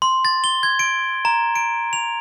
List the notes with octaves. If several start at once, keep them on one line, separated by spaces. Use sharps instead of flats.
C6
A6
G7
G#6
D7
A#5
D7
F7